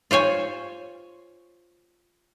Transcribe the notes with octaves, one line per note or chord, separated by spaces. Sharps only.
F4 C5 C#5 G#5